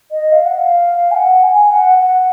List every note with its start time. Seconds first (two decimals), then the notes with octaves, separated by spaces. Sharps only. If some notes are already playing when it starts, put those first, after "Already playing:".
0.11 D#5
0.32 F5
0.45 F#5
0.58 F5
1.11 G#5
1.14 F#5
1.43 G#5
1.70 F#5
1.98 F#5